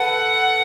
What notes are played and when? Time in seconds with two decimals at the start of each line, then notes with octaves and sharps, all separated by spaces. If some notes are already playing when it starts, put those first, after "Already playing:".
Already playing: A4 B4 F#5